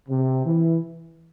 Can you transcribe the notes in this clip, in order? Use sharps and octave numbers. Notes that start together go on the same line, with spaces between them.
C3
E3